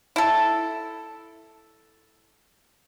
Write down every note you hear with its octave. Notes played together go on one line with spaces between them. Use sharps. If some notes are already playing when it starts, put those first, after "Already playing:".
E4 A4